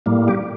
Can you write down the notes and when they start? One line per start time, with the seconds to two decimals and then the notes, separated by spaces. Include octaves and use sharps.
0.06 A2 G3 A#3
0.28 G4